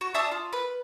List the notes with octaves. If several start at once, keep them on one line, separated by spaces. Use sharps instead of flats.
F#4
D4 E5 A5 D#6
F4
B4